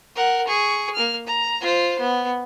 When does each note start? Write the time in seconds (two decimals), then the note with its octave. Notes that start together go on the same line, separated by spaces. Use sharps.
0.16 A#4 F#5
0.47 G#4 C#6
0.95 A#3 F6
1.27 A#5
1.61 F4 C5
1.99 B3